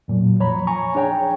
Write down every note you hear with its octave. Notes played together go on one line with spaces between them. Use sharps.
F2 A#2 F#3
F3 C#5 A#5 B5
G#5 A#5 C#6
D4 G#4 C#5 G5 A#5